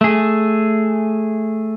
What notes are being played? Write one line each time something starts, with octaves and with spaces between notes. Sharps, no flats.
A3 G#4